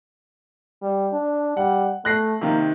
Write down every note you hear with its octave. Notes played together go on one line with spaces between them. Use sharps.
G3
D4
G3 F#5
A3 F#6 A#6 C7
C3 D#3 A#3